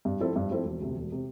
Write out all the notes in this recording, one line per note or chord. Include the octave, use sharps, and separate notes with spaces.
G2
F3 C4 E4 A4
G2
F3 C4 E4 A4
E1
D2 C3
E1
C3